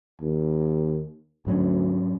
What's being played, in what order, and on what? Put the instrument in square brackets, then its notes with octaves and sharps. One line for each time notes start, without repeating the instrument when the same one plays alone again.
[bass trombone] D#2
[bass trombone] D2 [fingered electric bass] G#2 F#3 C#4